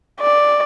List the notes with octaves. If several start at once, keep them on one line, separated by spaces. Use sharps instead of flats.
D5